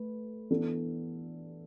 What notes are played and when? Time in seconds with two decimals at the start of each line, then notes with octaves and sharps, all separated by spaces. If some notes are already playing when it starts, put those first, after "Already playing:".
Already playing: A3 B4
0.50 E3 B3 D4 A4